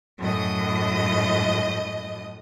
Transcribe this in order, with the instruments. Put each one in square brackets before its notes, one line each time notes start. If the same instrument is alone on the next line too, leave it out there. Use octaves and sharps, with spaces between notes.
[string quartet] F#2 A2 D#5 D#6